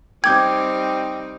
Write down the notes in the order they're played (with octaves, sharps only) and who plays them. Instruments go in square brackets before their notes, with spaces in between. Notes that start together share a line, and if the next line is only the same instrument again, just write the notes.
[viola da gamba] G3 C4 D#4 [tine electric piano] G5 D6 G6 [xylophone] G#6